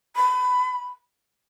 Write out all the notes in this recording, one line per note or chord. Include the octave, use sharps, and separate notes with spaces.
B5